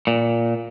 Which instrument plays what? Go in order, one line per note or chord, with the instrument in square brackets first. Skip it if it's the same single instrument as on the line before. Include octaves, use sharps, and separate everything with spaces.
[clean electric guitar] A#2